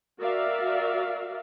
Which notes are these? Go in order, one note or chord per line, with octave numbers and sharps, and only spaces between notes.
F#4 A#4 D5 E5 F5